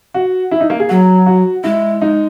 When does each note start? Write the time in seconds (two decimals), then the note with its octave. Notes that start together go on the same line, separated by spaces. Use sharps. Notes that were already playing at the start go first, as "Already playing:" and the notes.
0.14 F#4
0.51 E4
0.60 D#4
0.70 A#3
0.80 G#4
0.89 F#3 F#4
1.26 F#4
1.64 G#3 E4
2.02 D#4